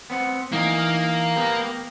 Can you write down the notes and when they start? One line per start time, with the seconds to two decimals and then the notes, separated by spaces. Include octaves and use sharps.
0.10 B3 C4 F#5
0.52 E3 A#3 D#4
1.36 B3 G4 A#4